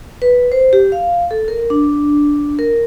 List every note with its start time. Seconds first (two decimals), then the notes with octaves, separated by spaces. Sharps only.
0.22 B4
0.52 C5
0.73 G4
0.92 F5
1.31 A4
1.48 A#4
1.70 D4
2.59 A#4